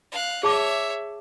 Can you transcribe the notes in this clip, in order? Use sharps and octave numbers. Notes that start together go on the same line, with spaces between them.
F5 F#6
G#4 C#5 E5 A5 D6